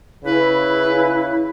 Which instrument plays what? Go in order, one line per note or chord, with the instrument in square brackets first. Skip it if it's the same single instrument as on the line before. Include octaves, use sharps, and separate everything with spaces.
[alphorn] C#3 [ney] E4 [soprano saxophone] B4